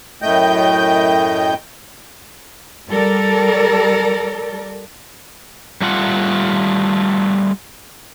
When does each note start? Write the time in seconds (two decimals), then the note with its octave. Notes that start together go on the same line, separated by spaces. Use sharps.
0.22 F#2 A2 A3 D#5 G5 G6
2.90 G3 A4 A#4 D5
5.81 G3 A3 F4 F#5